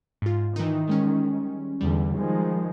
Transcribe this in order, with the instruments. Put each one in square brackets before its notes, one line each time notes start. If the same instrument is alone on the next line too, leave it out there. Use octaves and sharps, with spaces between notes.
[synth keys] G#2 F4
[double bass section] D#3 [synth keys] E3 D#4
[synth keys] G3 G#3 C#4
[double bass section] E2 D3 [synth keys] G3
[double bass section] D#3 F3 G#3